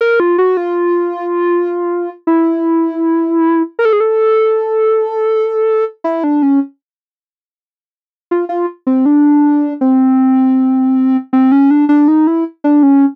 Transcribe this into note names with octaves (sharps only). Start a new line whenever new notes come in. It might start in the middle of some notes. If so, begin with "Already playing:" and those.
A#4
F4
F#4
F4
E4
A#4
A4
G#4
A4
E4
D4
C#4
F4
F4
C4
D4
C4
C4
C#4
D4
D4
D#4
E4
D4
C#4